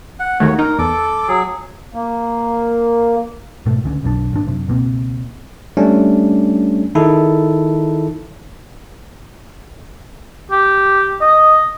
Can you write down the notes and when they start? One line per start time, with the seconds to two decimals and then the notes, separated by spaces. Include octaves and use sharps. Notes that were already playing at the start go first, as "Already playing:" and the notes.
0.20 F#5
0.40 D#2 D#3 A3 F#4 C#5
0.59 D#4 A#4
0.78 E2 A4 D6
1.28 F#3 G#4
1.94 A#3
3.66 G#2 B2 A3
3.84 C#2 D3 C#4
4.03 B1 F#2 D#3 D4
4.33 G#1 D4
4.47 F#2 C3
4.68 C#2 B2 A#3 C4
5.77 G3 A3 C#4 D4
6.95 D#3 D#4 E4 G#4 A4
10.51 G4
11.21 D#5